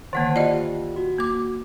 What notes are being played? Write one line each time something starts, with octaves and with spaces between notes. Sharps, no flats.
D3 D#3 A#3 C5 F#5 A5
F4 G4 D5 D#5
F#4
A#3 D6